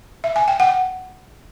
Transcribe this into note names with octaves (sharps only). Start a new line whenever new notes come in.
E5
G#5
G5
F#5